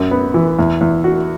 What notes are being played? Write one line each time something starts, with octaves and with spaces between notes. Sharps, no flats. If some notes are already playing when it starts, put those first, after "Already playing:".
Already playing: F#2
B3
E3
E2
E2
F#4